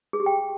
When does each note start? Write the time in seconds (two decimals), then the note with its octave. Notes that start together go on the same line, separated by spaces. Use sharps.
0.13 G#4
0.20 G4
0.26 G5